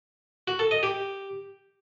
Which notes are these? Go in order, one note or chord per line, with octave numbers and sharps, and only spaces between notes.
F#4
A4
D#5
G4